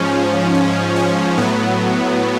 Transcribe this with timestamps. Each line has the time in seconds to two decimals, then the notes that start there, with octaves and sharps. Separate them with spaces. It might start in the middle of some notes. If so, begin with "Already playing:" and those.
Already playing: G#2 F3 C#4
0.54 C#4
0.96 C#4
1.38 A2 F#3 B3